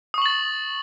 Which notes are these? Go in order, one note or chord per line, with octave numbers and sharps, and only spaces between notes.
C#6 D#6 A6 F#7